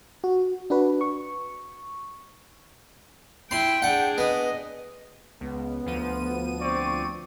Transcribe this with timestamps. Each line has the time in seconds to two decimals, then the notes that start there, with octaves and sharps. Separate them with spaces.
0.24 F#4
0.70 D4 F#4 B4
1.01 C#6
3.51 E4 G5 C6
3.82 D4 G#4 F#5
4.18 B3 D#5
5.40 C#2 B3
5.86 D2 F3 D#7
6.61 C4 D5 C#6